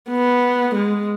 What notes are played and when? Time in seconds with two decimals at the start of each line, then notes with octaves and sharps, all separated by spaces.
0.10 B3
0.76 G#3